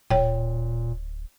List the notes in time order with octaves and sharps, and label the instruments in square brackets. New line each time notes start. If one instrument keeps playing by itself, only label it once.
[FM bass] D1 [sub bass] A#2 [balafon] C#5 G5